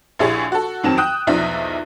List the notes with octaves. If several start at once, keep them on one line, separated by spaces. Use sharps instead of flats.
A#1 E4 G4 G#4 C#5
F#4 A4
F2 D#3 F#3 C4 A5 E7
G5 D#6 F#6
B1 E2 F3 D#4 D5 E5